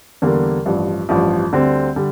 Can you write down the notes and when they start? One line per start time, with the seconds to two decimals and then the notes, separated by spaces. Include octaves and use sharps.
0.22 E2 D3 G3 A#3
0.65 A1 G2 F3
1.09 A1 G2 F3
1.52 D2 D3 G3 C4
1.96 D3 G3